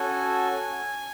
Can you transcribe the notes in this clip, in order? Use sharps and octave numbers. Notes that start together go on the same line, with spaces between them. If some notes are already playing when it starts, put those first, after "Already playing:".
Already playing: C#4 F#4 A4 G#5